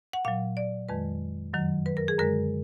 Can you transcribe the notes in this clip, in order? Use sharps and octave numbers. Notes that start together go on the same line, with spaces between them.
F#5
A#2 F#3 F5
D5
F2 D#3 G#3 B4
F#2 D#3 F#3
B4
A#4
G#4
F#2 D3 G#3 A#4